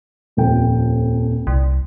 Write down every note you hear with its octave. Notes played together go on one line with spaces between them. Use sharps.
D#1 F2 G5
C2